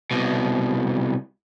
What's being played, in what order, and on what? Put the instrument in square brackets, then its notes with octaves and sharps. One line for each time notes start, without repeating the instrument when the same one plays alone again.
[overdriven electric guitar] C2 B2